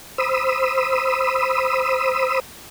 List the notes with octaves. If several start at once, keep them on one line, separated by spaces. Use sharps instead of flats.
C5 B5 D#6 E6